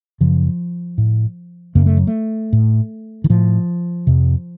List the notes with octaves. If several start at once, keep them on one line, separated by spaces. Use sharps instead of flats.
F#2 C#3 F3
A2
F#2 C#3 A#3
A3
F#3
A3
A2
D#3
A2 F3
F2 C3